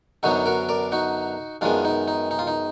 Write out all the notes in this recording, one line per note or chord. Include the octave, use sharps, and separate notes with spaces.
F#2 D3 F#3 B3 D4 D#4 F#4
F#4 A#4
A#4 D5
D#4 F#4
F#2 D#3 G#3 B3 D4 F4
D#4
D#4
D#4
F4
D#4